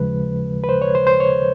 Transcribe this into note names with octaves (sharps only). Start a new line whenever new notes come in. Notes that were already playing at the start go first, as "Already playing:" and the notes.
Already playing: D#2 C#3 F3 G#3 B4
B4
C5
C#5
C5
C5
C#5